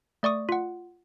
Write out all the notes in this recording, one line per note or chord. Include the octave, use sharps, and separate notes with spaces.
A3 D5 C#6 D#6
F4 F#5